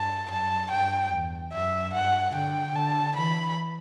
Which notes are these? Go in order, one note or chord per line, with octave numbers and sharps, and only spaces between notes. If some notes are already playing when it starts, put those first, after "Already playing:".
Already playing: G2 A5
F#2 A5
G2 G5
E2
F#2 E5
G2 F#5
D3 G5
D3 A5
E3 B5